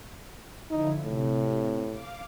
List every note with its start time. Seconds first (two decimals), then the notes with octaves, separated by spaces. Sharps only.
0.71 D3 F3 D#4 E4
1.05 A2 C3
1.90 F5 D6